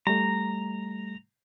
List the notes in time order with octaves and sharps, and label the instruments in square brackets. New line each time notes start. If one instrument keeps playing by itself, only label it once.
[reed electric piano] G3 A3 [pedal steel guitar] A#5